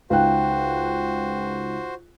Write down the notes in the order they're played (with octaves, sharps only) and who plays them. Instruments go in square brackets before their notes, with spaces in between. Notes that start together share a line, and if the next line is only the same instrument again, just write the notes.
[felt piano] C#2 D#4 F#6 [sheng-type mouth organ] F#4 C5 [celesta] F5 G5